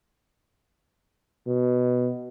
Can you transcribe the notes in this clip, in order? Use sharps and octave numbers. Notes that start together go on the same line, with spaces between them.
B2